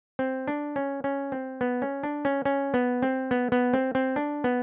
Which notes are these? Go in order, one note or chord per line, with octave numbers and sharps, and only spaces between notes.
C4
D4
C#4
C#4
C4
B3
C#4
D4
C#4
C#4
B3
C4
B3
B3
C4
C4
D4
B3